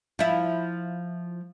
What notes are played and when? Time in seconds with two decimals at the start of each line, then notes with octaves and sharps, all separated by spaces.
0.19 F3 E4